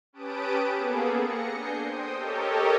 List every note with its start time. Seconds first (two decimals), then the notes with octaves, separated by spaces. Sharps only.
0.13 C#4 G4 B4 A5 D#6 D7
0.74 A#3 B3 G#4 A4
1.19 A#6 C#7
1.52 D4 G#5 G6 C7
1.82 C5 G5 D#6
2.14 G4 A4 A#4 C#5 D#5